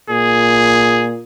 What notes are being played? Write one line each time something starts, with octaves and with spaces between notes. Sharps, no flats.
A#2 G#4